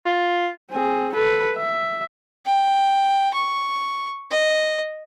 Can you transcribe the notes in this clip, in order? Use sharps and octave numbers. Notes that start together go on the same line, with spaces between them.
F4
C4 G#4
A4 B4
E5
G5
C#6
D#5